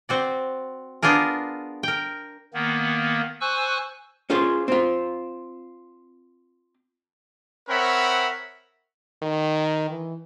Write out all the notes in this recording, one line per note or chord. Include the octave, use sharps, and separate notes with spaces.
C4 F#4 D5
B3 D4 F4 G#4 A#4
A#4 G5
D#3 A#3 B3
C5 G#5 C#6 E6 F#6
C#4 F4 G#4 C5
C4 F4
C4 A#4 C#5 E5 F#5 B5
D#3
E3